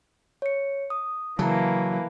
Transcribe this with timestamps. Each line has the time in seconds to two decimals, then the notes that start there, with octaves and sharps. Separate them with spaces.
0.42 C#5 C#7
0.90 D#6
1.39 C#3 E3 F#3 A#3 A5 A#5